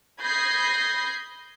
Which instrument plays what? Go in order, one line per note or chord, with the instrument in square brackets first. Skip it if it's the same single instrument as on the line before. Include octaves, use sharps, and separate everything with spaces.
[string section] B5 D#6 G6 G#6 A#6 C7